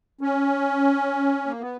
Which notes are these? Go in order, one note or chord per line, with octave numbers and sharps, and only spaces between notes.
C#4
A#3
B3